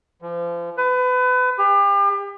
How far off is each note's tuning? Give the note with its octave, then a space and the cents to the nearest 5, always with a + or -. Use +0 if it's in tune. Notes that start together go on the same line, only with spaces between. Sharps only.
F3 -35
B4 +30
G4 +35